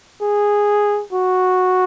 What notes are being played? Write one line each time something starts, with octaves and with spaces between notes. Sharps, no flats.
G#4
F#4